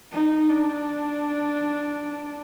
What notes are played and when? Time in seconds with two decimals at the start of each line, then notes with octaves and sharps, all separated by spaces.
0.12 D#4
0.49 D4